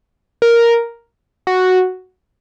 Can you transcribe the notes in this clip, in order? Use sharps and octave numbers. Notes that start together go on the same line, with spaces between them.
A#4
F#4